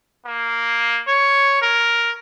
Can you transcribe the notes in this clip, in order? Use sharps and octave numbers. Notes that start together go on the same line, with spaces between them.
A#3
C#5
A#4